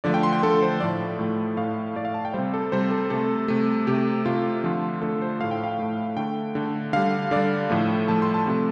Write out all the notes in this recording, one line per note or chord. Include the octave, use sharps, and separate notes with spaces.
D3 F3 A3 D5
G5
C6
G5
D3 F3 A3 A4
C5
A2 F3 A3 D5
A2 F3 A3
A2 A3 F5
A2 A3 D5
F5
A5
G5
C3 G3 C5
A4
C3 G3 C5
A4
C3 A3 A4
C3 A3
C3 A3 G4
C3 A3 F4
D3 F3 A3
D3 F3 A3 A4
C5
A2 A3 F5
G5
F5
A2 A3
D3 A3 G5
D3 A3
D3 G3 F5
D3 G3 D5
A2 F3 A3
A2 F3 A3 A5
C6
A5
C3 F3 A3